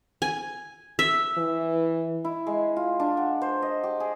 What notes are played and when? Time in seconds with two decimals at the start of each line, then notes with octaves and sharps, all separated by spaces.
0.22 G#5
0.99 E5
1.38 E3
2.25 E4
2.47 G#3
2.77 F4
3.00 D4
3.17 F#5
3.41 C5
3.62 D#5
3.84 G4
4.00 G#4